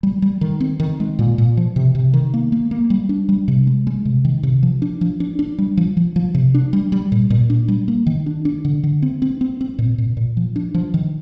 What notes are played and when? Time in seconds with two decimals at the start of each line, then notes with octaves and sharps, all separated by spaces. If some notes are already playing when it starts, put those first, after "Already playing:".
0.03 G3
0.22 G3
0.41 D#3
0.60 C4
0.80 D#3
1.00 G#3
1.19 A#2
1.38 A#2
1.57 F3
1.76 C3
1.95 C3
2.13 D#3
2.34 A#3
2.52 A#3
2.71 A#3
2.90 G3
3.09 D4
3.29 G3
3.48 C3
3.67 G#3
3.87 G#3
4.05 C3
4.25 D#3
4.43 C3
4.63 F3
4.82 D4
5.01 F3
5.20 D4
5.39 D4
5.58 G3
5.77 F3
5.97 F3
6.16 F3
6.35 C3
6.54 D4
6.73 G3
6.92 G3
7.12 A#2
7.30 A#2
7.50 D4
7.68 G3
7.88 A#3
8.06 D#3
8.26 D4
8.45 D4
8.65 D3
8.83 D3
9.02 C4
9.22 C4
9.41 C4
9.61 C4
9.79 A#2
9.98 A#2
10.17 A#2
10.37 F3
10.56 D4
10.74 F3
10.94 D#3